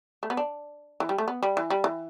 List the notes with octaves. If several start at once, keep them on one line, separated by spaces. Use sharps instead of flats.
A3
B3
D4
E3
G3
A3
B3
G3
E3
G3
E3